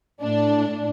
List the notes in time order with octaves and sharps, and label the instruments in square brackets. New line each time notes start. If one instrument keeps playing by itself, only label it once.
[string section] A2 D4